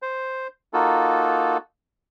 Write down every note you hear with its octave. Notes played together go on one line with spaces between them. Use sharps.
C5
A#3 D#4 F4 F#4 A4